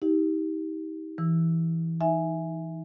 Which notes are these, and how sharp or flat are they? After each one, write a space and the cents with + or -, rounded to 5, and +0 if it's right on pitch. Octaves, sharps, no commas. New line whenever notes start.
D#4 +40 G4 +0
E3 +0 E6 +0
D#4 +15 E5 +0 G#5 +0